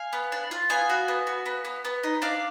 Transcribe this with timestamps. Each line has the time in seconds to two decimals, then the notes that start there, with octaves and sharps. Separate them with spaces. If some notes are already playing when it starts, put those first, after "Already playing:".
Already playing: F5 G#5
0.13 B3
0.32 D4
0.51 F4
0.70 B3 F5 G#5
0.90 F#4
1.08 B3
1.27 F#4
1.46 B3
1.65 B3
1.85 B3
2.03 D#4
2.22 D4 D5 F5